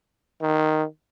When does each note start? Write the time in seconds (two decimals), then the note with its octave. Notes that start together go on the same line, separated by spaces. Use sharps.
0.41 D#3